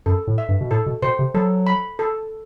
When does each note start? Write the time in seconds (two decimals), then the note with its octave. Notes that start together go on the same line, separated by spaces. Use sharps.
0.06 F#2 A4
0.27 A2
0.38 E5
0.49 G2
0.61 B2
0.71 A2 A4
0.86 B2
1.02 B2 C5
1.19 C3
1.34 F#3 A4
1.67 B5
1.99 A4